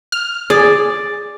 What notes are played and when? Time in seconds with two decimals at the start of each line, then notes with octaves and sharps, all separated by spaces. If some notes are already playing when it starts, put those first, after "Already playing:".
0.12 F6
0.50 G#4 D5